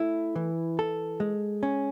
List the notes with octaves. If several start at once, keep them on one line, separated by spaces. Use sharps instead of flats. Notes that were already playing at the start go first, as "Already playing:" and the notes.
Already playing: A3 E4
E3
A4
G#3
C#4